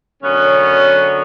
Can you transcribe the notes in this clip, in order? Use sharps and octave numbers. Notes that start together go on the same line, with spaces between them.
F#2 D3 F#3 B3 C#4